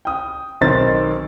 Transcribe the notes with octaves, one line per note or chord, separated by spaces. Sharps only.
G5 D#6
B1 D#3 C4 C5 A6